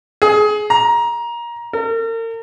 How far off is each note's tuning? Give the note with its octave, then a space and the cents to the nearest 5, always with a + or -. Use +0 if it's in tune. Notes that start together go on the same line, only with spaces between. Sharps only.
G#4 +25
A#5 +20
A#4 -40